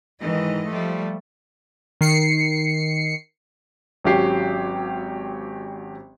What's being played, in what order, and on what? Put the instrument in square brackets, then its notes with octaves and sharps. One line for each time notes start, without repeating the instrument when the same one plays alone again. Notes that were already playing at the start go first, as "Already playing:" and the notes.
[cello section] G#2 D#3 E3 D#5
F3 G3 A3
[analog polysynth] D#3 C7 C#7
[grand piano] G#1 F#3 C#4 G4 C7